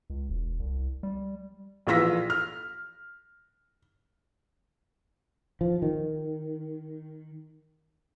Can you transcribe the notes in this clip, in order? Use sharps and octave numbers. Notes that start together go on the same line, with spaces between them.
C#2
E1
C2
G3
A#1 E3 F4 E6 A#6 B6
F6
F3
D#3